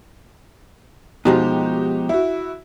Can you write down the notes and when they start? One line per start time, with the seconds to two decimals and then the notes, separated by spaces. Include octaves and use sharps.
1.25 B2 F3 G#3 D#4 F#4 G4
2.09 E4 F#4